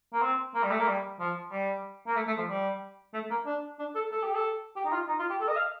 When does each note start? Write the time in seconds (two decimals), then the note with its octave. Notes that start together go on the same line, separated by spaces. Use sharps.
0.13 A#3
0.22 C4
0.55 A#3
0.63 G3
0.71 A3
0.79 A#3
0.88 G3
1.20 F3
1.52 G3
2.07 A#3
2.16 A3
2.27 A3
2.38 F3
2.49 G3
3.14 A3
3.30 A#3
3.46 D4
3.79 D4
3.95 A4
4.11 A4
4.23 G4
4.35 A4
4.76 G4
4.85 D#4
4.93 F4
5.08 D#4
5.19 F4
5.30 G4
5.41 A4
5.48 D#5
5.56 F5